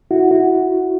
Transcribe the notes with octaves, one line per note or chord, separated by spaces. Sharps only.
E4 F#4
E4 F#4